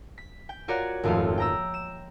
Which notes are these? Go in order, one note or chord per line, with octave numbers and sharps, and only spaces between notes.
B6
G5
F4 F#4 A#4 C#5 D5 F#5
D#1 G#1 F2 A3 F5
G5 A#5 E6
E7